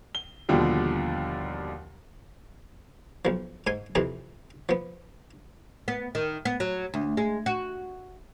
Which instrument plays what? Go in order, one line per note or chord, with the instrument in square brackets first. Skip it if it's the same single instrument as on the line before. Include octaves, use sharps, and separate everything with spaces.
[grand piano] G7
D#2 B2 D3 F3 G3
[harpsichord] B1 F3
G#2 G#5 C6
F2 C3 E3 G#4 C5
F3 B3
[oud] B3
D#3
B3
F#3
D2
G#3
F#4